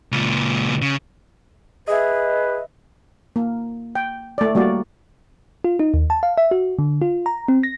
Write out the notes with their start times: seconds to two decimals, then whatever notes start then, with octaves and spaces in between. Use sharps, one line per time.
0.12 C#2 A#2
0.82 C#3
1.88 G#4 B4 D#5 E5
3.36 A#3
3.95 G5
4.38 A3 D5
4.55 G3 A#3 F#4 D5
5.64 F4
5.79 D#4
5.94 D#2
6.10 A5
6.23 F5
6.38 E5
6.51 F#4
6.79 D3
7.02 F4
7.26 A#5
7.48 C4
7.63 A#6